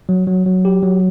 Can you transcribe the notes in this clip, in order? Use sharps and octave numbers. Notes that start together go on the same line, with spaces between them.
F#3
F#3
F#3
G4
F#3